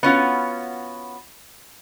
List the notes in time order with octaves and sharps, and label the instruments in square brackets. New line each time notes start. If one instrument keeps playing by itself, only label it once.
[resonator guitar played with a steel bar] B3 C#4 F4 F#4